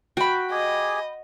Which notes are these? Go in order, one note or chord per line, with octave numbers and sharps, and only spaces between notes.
F#4 G5 B5
G4 G#4 D#5 G#5